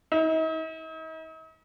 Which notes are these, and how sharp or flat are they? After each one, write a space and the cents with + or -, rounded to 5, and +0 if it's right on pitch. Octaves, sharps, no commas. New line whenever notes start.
D#4 +45